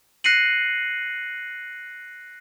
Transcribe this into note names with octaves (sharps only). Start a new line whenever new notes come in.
F#6 A#6 C7 C#7 D#7 F#7